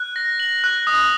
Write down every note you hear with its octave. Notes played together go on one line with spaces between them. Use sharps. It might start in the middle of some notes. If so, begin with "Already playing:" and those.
Already playing: F#6
A#6
F#7
F#6
D#6